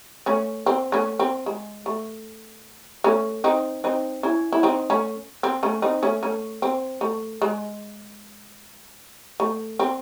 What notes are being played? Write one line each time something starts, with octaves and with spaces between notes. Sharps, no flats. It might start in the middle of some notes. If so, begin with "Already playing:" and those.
A3 C#4
C4
A3 C#4
C4
G#3
A3
A3 C#4
C4 D#4
C4 D#4
C#4 E4
E4
C4 D#4
A3 C#4
C4
A3 C#4
C4 D#4
A3 C#4
A3 C#4
C4
A3
G#3
A3
C4